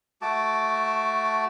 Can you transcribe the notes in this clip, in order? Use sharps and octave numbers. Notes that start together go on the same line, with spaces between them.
A3 F#4 A5 D6